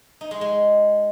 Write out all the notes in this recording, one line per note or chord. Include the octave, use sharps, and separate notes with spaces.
D#4
G#3
G#3